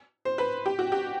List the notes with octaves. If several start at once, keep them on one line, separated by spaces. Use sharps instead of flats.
C5
B4
G4
F#4
G4